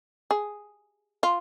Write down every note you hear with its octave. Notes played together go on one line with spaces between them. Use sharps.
G#4
F4